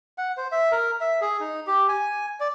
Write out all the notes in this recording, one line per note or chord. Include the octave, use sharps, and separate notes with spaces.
F#5
C5
E5
A#4
E5
G#4
D#4
G4
G#5
D5